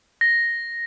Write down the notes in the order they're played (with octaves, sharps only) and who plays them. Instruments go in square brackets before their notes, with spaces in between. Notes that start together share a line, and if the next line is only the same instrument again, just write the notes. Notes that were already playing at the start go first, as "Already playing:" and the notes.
[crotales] A#6